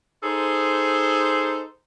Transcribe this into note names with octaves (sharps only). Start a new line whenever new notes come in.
D#4 G#4 A4 C5